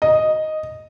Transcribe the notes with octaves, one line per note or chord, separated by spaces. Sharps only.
D#5